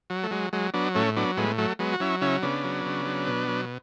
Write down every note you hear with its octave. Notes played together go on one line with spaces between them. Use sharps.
F#3
A3
F#3 G#3
F#3 G#3
F#3 B3 D4
A2 A3 C#4
F#3 B3 D4
A2 G#3 B3
F#3 A3
F#3 G#3 B3
F#4
F#3 C#4 E4
C#3 C#4 E4
C#3 B3 D4
F#3
C#3
F#3
B2
F#3